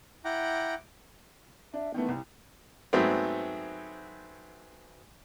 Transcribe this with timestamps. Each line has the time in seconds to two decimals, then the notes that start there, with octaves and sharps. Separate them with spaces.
0.25 E4 F#5 G5 A#5 D6
1.74 D4 E5
1.94 D#3 E3 A3 B3
2.09 C2
2.93 G#2 F#3 A3 B3 C4